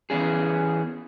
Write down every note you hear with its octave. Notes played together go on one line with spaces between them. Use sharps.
E3 B3 C#4 G#4